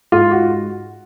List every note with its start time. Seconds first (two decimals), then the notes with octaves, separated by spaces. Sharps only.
0.12 G#2 F4
0.32 F#4